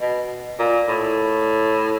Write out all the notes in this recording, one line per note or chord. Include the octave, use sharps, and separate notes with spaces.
B2
A#2
A2